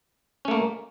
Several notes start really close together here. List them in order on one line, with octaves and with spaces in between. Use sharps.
C#4 A3 A#3